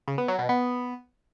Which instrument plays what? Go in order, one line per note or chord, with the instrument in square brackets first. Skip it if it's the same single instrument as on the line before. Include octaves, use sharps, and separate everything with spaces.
[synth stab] C#3
B3
F#3
B2
B3